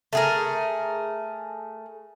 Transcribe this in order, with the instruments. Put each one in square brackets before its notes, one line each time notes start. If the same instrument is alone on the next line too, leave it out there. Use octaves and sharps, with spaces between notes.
[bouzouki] A3 G#4 A#4